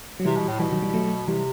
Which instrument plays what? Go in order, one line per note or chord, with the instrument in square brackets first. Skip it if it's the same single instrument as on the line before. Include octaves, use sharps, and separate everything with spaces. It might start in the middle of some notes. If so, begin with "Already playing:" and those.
[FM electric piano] F#3
[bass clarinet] C3 [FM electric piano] E3 G3
[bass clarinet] B2
A2
[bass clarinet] B2 [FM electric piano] E3 G3
[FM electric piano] D#3 F#3
E3 G3
F#3 A3
[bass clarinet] C3 [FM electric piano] E3 G3